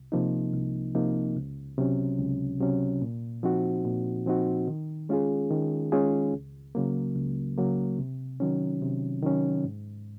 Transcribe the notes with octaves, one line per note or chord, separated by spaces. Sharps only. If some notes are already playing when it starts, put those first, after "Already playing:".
Already playing: C2
C3 F3 A#3 D#4
C2
C3 F3 A#3 D#4
C#2
C3 F#3 C#4
C#2
C3 F#3 C#4
A#2
F3 C4 D#4 F#4
A#2
F3 C4 D#4 F#4
D#3
G#3 C#4 F4 G#4
D#3
G#3 C#4 F4 G#4
C#2
C#3 F#3 A#3
C#2
C#3 F#3 A#3
C3
D#3 F#3 C#4
C3
D#3 F#3 C#4
G#2